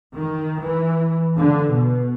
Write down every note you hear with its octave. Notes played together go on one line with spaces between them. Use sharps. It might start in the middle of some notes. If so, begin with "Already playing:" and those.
D#3
E3
D3
B2